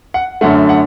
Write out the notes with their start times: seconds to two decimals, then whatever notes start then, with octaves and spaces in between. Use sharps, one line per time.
0.14 F#5
0.41 F#2 D3 A3 F#5
0.69 F#5